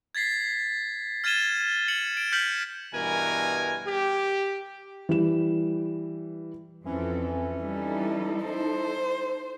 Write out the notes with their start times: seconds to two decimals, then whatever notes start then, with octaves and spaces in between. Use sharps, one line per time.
0.15 G#6 A6 B6 C7
1.24 F6 G#6 A6 D#7 E7 G7
1.88 C#7 F#7
2.17 D7 E7
2.32 F6 G6 B6 C#7 F#7
2.93 G2 B2 E3 A#4 G#5
3.87 G4
5.09 E3 G3 E7
6.86 F2 E3 C4 C#4 A4
7.63 G3 D#4 E4 A4
8.43 C5